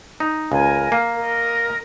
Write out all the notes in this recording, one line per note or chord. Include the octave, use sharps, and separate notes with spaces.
D#4
C#2 A#4 G#5
A#3
A#4 D#5